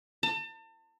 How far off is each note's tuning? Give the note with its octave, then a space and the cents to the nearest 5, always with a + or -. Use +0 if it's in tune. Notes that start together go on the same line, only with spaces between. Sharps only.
A5 +35